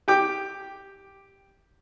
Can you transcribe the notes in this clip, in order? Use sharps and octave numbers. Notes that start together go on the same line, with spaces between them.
G4 G5 D6